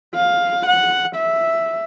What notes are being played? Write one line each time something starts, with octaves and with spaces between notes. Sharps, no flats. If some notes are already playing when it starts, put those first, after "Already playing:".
F5
F#5
E5